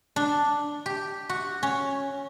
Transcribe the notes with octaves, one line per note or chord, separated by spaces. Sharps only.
D4
G4
F#4
C#4